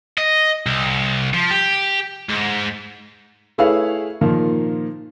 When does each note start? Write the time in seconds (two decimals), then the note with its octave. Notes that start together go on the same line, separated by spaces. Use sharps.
0.18 D#5
0.66 C2
1.34 F3
1.50 G4
2.29 G#2
3.58 A3 E4 G#4 B4 C#5 F5
4.21 A#2 D#3 F3 A#3